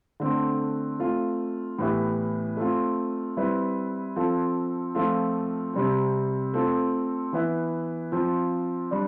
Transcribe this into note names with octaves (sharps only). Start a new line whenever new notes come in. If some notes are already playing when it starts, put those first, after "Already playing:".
D3 A3 C4
A3 C4 F4
A2 E3 B3 E4 G4
A3 C4 F4
G3 C4 E4 B4
F3 C4 F4 A4
F3 A3 C4 F4
C3 G3 C4
A3 C4 F4 A4
E3 B3 E4
F3 C4 F4
G3 D4